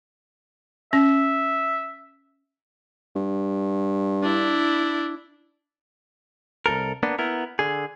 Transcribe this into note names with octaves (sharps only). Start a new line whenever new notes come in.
C#4 E5
G2
D4 E4
C2 G#2 A4 A#4
A#3 B3 D4
B3 E4 A#4
D3 G#4